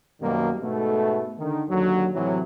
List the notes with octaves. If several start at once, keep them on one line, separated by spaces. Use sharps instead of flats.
F#2 B2 D#3 G3 A#3
G#2 B2 A3
D3 D#3
D#2 D3 F#3
A2 C3 E3 F#3